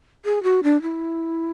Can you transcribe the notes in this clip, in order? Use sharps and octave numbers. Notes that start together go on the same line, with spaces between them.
G#4
F#4
D4
E4